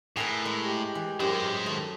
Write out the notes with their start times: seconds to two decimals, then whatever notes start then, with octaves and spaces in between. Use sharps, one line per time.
0.16 A2 G#4 A#4 B4
0.45 G#3
0.61 G4
0.95 E3
1.20 F#2 G#3 G4 C5
1.66 D#3 A3